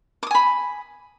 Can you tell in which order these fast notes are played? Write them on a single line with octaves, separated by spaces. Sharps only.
D6 D#6 G#5 B5